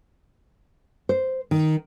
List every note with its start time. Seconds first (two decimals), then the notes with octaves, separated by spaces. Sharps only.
1.09 C5
1.51 D#3